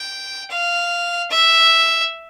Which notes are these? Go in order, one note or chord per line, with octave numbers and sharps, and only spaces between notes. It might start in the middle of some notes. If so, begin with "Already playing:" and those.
Already playing: G5
F5
E5